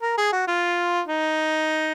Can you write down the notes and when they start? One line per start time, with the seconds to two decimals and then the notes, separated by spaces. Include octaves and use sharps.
0.02 A#4
0.18 G#4
0.33 F#4
0.47 F4
1.08 D#4